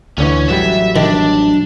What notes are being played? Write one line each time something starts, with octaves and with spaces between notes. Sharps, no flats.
D2 D3 E3 C#4
A1 F#3 G3 E5
D#3 D4